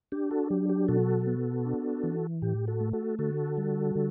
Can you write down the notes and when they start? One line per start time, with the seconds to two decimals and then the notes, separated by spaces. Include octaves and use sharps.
0.12 D4 G4
0.31 F#4 A4
0.50 F#3 G4
0.69 G4
0.88 B2 F#4 A4
1.27 B3
1.65 D4
2.03 E3
2.42 A2 G4
2.67 F#4 A4
2.80 A3
2.93 F#4 A4
3.19 D3 F#4 A4
3.58 G3
3.95 D3